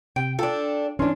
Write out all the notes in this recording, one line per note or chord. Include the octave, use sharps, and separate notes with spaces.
C3 G5
D4 F4 A4 G5
E3 C#4 D4 C6